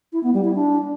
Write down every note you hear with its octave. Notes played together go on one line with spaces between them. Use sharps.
E4
B3
G3
E4
D4